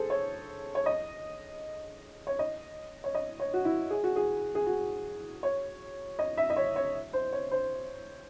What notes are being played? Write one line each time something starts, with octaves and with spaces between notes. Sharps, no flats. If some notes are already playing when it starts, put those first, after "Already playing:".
Already playing: G#4 A4 C5
C#5
C#5
D#5
C#5
D#5
C#5
D#5
C#5
F#4
E4
G#4
F#4
G#4
G#4
F#4
C#5
D#5
E5
D#5
C#5
C#5
C5
C#5
C5